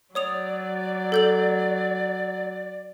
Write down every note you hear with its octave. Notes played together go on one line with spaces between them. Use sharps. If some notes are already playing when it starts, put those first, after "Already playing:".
F#3 C#5 D5 D#6 F7
A4 G6 F#7